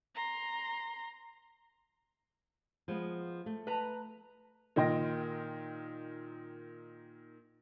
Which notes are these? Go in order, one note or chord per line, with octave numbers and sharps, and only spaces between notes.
A#5 C6
F3 G#3 B3
A3
B4 A#5
A#2 D#3 D#5 G5 C6 A#6